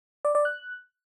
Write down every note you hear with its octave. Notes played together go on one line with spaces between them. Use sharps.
D5
D5
F#6